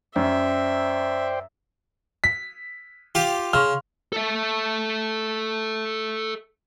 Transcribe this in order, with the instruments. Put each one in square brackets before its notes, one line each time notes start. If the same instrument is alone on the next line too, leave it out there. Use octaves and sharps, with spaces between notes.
[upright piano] F#2 [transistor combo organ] C5 D5 G5 [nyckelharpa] E5
[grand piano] B6
[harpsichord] F4 G4 [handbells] G5
[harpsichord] C#3 [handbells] F5 C6 C#6 [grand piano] F6
[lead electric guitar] A4 E5